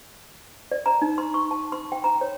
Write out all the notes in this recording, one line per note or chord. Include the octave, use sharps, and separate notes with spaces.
D5
A#5
D#4
C6
C#6
A5
C6
G5
A#5
C#5